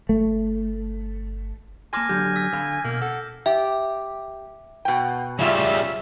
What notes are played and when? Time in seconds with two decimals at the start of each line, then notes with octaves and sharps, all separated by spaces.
0.09 G1 A3
1.93 A#3 G#5 A5 C6 D6 F6 A#6
2.09 D3 F#3 G4 G6
2.36 E6 B6
2.53 D3 F5 B5
2.84 B2 A#3
3.02 A4 F#5
3.46 G4 E5
4.85 B2 G5
5.39 C#3 G3 C#4 F4 E5